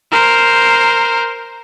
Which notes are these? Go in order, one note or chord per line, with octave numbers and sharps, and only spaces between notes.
A#4 C5